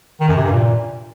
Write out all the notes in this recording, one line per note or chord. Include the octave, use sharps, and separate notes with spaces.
D#3
F#2
C3
G2
A#2